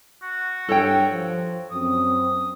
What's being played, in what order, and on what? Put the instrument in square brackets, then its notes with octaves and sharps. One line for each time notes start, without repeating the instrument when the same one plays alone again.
[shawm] F#4
[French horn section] G2 [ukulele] A4 C#5 G5
[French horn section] F3
[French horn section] F#2 C4 [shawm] D#6